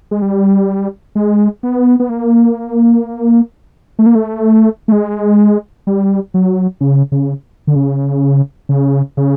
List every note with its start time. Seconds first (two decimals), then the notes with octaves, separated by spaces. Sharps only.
0.11 G#3
0.22 G3
1.15 G#3
1.63 B3
2.00 B3
2.09 A#3
3.99 A3
4.06 A#3
4.15 A3
4.88 A3
4.92 G#3
5.87 G3
6.34 F#3
6.81 C#3
7.12 C#3
7.67 D3
7.76 C#3
8.69 C#3
9.17 C#3